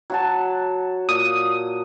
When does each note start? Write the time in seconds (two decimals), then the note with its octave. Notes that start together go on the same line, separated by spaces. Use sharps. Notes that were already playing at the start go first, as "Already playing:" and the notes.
0.10 F#3 F#4 A5
1.09 A#2 D#6